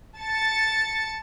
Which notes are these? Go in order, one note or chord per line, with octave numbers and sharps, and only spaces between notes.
A5 A6 C#7